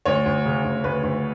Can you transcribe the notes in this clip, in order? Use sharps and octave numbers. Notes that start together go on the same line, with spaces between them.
D2 C#5
D2
C#3
D2
D2 B4
D2